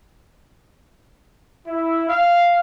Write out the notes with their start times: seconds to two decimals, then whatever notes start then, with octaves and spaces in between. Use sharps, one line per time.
1.66 E4
2.08 F5